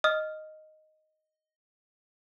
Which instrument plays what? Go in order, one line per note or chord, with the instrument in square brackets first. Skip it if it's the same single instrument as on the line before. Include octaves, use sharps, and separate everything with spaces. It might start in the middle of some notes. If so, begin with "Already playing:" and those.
[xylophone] D#5 D#6 F6